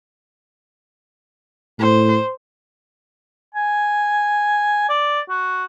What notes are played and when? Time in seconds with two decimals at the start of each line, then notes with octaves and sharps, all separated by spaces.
1.79 A2 C5
3.55 G#5
4.89 D5
5.30 F#4